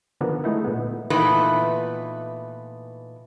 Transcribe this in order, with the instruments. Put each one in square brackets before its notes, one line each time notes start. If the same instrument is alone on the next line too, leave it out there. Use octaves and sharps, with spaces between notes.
[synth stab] D3 D#3 F3 A#3 B3
G#3 A3 D#4 E4
A#2 B3
[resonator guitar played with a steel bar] A#2 E3 A3 B3 D#4 B4